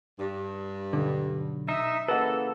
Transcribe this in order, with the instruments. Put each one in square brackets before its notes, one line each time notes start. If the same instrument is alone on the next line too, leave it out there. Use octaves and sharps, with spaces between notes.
[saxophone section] G2
[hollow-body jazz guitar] B1 D3
[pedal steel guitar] D#4 [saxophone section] E5
[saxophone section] C#3 E3 A#3 [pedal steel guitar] A4 [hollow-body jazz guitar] B4 D#5 F#5